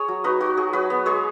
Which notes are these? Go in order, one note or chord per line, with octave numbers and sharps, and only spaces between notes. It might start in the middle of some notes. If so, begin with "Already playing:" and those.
Already playing: G#4 C#5
F#3
D#4 F#4 B4
D#4 F#4
F#3 G#4
F#3 F#4 B4
B3
G#3 G#4 C#5